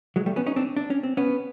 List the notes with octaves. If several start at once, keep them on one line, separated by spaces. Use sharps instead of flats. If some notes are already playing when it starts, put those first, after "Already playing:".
F#3 G#3
G3 A3
B3 C#4
C#4 D#4
C4 D4
D4
C#4
C4
B3 C#4